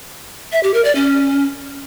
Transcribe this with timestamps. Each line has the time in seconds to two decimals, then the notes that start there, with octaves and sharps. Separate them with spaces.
0.52 E5
0.63 G4
0.74 A#4
0.85 D5
0.95 C#4